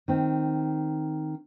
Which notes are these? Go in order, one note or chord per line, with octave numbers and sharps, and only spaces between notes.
D#3 C4